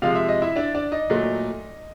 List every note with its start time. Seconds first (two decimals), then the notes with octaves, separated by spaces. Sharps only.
0.02 C3 F3 G#3 F5
0.15 E5
0.29 D#5
0.42 E4 E5
0.56 D4 D5
0.75 D4 D5
0.92 D#4 D#5
1.10 A#2 F#3 A3